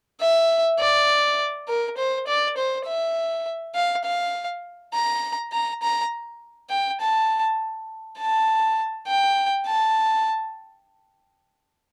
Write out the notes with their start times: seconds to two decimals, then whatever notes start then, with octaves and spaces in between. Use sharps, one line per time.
0.20 E5
0.79 D5
1.68 A#4
1.98 C5
2.27 D5
2.57 C5
2.86 E5
3.75 F5
4.05 F5
4.94 A#5
5.53 A#5
5.83 A#5
6.70 G5
7.01 A5
8.19 A5
9.08 G5
9.67 A5